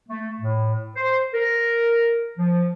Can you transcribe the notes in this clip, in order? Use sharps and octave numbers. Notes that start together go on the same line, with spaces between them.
A3
A2
C5
A#4
F3